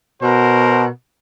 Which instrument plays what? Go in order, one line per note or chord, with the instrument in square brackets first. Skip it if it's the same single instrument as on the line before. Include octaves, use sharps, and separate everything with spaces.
[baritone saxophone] B2 [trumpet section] F#4 A#4 C5